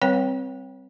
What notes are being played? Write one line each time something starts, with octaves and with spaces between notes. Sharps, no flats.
G3 C4 B4 C#5 G5